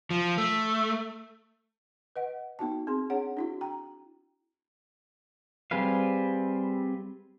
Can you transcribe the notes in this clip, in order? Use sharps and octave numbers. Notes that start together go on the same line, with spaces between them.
F3
A3
B4 D#5 F#5
B3 D#4 F#4 A5
C4 G#4 C6
D4 G#4 C#5 F#5
D4 E4 F#4
G5 A#5
G3 C4 G#4 B4 F5